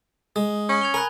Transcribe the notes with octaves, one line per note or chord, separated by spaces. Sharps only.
G#3 D#6
C#4
G#6 F7 G7
A#4 G#5 B5 F#6